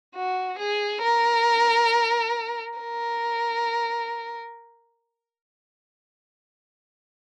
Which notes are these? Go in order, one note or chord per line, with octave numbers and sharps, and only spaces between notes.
F#4
G#4
A#4
A#4